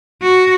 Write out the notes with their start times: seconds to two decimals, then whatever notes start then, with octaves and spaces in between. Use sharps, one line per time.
0.22 F#4